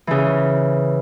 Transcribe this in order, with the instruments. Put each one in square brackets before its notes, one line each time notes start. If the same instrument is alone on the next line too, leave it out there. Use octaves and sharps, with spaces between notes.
[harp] C#3 E3